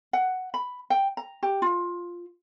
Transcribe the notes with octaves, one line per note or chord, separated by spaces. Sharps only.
F#5
B5
G5
A#5
G4
F4